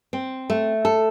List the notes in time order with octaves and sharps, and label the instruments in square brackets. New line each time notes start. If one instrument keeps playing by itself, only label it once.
[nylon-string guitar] C4
A3
A4